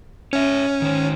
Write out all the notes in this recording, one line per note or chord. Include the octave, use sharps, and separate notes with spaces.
C#4 C#5 E5
D#3 C5